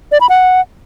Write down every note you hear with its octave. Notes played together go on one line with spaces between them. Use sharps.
D5
B5
F#5